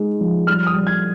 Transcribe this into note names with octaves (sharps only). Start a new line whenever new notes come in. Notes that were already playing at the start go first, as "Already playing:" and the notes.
Already playing: G#3 D#4
F3
G3 F6
D#6
G3
G#6